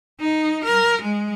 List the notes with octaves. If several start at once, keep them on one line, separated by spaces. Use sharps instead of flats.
D#4
A#4
G#3